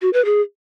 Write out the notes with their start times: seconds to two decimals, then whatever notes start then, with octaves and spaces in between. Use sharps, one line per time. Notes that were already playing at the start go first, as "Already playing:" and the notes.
0.02 F#4
0.13 B4
0.25 G#4